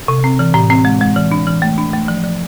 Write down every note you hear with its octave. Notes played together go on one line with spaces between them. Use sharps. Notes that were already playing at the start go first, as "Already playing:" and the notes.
C3
C4
E3
A2
C4
G#3
G#3
E3
D4
E3
A3
D4
A3
F3
F3